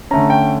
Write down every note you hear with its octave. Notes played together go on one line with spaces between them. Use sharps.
D3 A3 C#4 A#5
G5